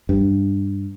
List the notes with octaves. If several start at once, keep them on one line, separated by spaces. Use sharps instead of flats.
G2